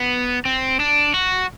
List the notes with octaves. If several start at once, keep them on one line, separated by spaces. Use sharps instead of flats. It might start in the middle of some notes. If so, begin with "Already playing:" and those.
Already playing: B3
C4
D4
F#4